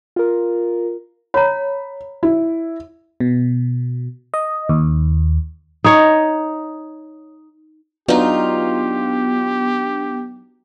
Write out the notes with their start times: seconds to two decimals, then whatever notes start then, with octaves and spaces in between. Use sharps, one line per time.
0.16 F4 A#4
1.34 C#5 A#5 B5
2.23 E4
3.20 B2
4.34 D#5
4.69 D#2
5.84 D#4 C#5
8.08 F#3 B3 D4 D#4 F4 G4